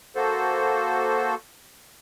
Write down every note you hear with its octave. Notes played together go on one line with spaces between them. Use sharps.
A#3 F#4 A4 C5